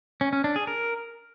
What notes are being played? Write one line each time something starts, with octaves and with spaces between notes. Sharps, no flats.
C#4
C#4
D4
G#4
A#4